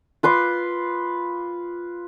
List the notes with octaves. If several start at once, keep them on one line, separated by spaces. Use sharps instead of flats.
F4 B4 C6 D6